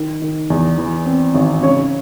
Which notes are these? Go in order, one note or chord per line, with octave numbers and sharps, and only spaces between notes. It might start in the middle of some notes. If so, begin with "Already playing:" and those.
Already playing: D#3
D#3
E2
E3
C4
G#1
C#3 C#5